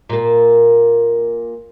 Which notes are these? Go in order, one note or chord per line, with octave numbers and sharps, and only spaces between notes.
A#2 A#3